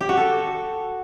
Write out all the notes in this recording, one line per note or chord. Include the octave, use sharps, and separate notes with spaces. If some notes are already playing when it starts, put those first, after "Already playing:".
G4
F#4
A4